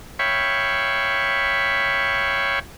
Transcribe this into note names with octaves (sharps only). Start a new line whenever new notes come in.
C#5 E5 F5 G5 B5 C#6